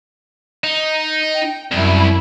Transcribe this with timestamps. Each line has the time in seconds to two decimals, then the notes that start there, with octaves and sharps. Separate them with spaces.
0.64 D#4
1.35 G5
1.72 C2 F#2 E4